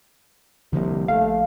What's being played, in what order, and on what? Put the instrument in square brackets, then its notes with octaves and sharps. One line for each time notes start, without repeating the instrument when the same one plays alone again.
[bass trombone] C2 [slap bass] D3 F3 A#3
[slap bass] A#1 [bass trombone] A3 [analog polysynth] F5